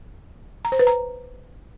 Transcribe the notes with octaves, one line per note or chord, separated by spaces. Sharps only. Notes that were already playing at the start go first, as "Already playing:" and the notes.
A#5
C5
B4
A#5